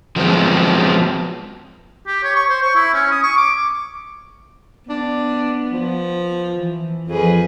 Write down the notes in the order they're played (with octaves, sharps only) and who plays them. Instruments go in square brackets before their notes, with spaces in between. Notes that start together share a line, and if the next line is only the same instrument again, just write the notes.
[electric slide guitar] F3 F#3 G#3 B3 C4
[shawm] G4
C#5
C#6
C5
C#6
E4
C#4
D#6
C#6
D6
[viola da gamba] B3 [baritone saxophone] D4
[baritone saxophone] F3
[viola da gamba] E3
[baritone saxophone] F2 [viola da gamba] F3 G#4 B4